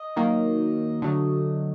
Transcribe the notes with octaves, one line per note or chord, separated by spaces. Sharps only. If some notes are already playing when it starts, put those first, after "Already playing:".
Already playing: D#5
D#3 F#3 A#3
D3 F#3 A3